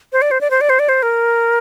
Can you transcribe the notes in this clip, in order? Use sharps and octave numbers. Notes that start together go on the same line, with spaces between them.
C5
D5
C5
D5
C5
D5
C5
D5
C5
A#4